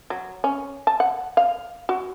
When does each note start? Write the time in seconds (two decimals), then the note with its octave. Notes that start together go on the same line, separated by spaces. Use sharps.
0.10 F#3
0.44 C#4
0.87 A5
1.00 F#5
1.37 F5
1.89 F#4